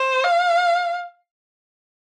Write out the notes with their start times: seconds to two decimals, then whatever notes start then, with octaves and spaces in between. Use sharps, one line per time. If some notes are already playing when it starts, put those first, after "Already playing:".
Already playing: C5
0.24 F5